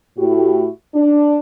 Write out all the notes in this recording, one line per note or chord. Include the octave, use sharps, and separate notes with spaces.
A2 A3 E4 F#4 G4
D4